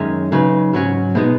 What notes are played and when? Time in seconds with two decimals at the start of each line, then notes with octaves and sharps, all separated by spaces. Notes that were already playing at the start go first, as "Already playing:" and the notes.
Already playing: F#2 D#3 G#3 C#4
0.32 C#3 F#3 D#4 B4
0.73 G#2 F#3 C#4 F#4
1.15 B2 G#3 B3 D#4